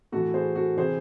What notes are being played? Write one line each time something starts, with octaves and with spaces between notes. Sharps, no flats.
A2 E3 F#4 A4
G#4 C5
F#4 A4
C3 E3 G#4 C5